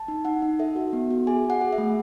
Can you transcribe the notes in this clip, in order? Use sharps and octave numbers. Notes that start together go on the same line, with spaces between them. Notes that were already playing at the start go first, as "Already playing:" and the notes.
Already playing: A5
D#4
D#4 F#5
D#4
A4 E5
F#4
B3
F#4
G#4 G#5
G#4
F#5
G#4
E5
A3